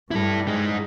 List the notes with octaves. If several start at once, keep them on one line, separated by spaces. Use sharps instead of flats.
G2 G3 E4 A4
G#3 D#4